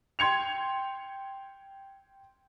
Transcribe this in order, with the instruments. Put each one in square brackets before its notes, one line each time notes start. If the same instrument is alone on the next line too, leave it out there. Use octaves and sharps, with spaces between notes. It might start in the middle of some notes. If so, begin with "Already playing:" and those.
[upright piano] G5 C6 G#6 C#7 F7